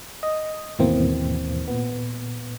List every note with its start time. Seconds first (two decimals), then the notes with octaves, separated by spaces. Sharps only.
0.23 D#5
0.79 D#2 G#2 B2 E3 A#3 C4
1.68 A#2 B3